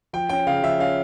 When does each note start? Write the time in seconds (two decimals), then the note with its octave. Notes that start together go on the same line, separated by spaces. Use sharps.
0.13 F3 G5
0.29 C#4 G5
0.47 C#3 F5
0.63 F3 E5
0.79 C#4 F5